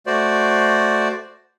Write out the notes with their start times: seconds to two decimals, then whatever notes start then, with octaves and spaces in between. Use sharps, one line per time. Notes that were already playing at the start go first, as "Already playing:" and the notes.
0.06 A3 F#4 C5 D5